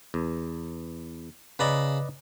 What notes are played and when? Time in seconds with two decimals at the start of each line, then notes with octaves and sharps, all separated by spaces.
0.14 E2
1.59 C#3 B4 D5 D#5 A#5 B5